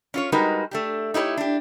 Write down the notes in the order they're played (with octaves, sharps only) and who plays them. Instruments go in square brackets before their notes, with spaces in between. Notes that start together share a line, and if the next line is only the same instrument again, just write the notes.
[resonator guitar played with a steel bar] C#4 F4 C#5
G3 G#3 D#4 F#4 A#4 B4
A3 D4 G4
D#4 E4 G4 A#4 C#5
D4 G4